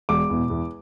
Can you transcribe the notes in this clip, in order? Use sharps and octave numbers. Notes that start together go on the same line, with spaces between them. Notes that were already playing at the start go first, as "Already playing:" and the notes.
E1 D6
E2 B2
E2